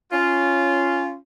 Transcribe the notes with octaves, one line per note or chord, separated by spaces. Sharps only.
C#4 F4